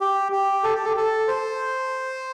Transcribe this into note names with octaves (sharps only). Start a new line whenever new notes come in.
G4
G4
A4
G4
A4
A4
C5